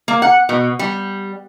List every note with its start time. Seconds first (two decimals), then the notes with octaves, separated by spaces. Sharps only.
0.08 A#3
0.22 F#5
0.49 B2
0.79 G3